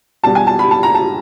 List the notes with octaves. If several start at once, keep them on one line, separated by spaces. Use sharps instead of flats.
E2 B2 G3 A5
G#5
A5
B5
A5
A#5
A5